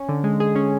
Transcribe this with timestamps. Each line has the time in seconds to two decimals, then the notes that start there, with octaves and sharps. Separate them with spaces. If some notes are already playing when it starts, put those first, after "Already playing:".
Already playing: C#4
0.09 D3
0.24 G#3
0.40 G#4
0.56 C#4